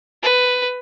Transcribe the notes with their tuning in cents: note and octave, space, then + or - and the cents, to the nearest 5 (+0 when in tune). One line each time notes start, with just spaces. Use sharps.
B4 +10